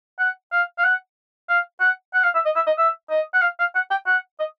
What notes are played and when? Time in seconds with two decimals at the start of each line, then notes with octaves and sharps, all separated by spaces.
0.19 F#5
0.52 F5
0.79 F5
0.84 F#5
1.49 F5
1.80 F#5
2.14 F#5
2.24 F5
2.35 E5
2.46 D#5
2.56 E5
2.67 D#5
2.78 E5
3.10 D#5
3.34 F#5
3.42 F5
3.59 F5
3.75 F#5
3.90 G5
4.07 F#5
4.39 D#5